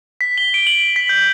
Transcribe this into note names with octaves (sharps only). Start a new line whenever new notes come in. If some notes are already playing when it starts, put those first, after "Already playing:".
B6
G7
D7
F#7
B6
G6